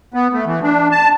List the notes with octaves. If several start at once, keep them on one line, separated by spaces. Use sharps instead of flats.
B3
A3
E3
D4
A5